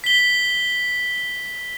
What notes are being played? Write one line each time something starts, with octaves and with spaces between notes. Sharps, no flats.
B6 G7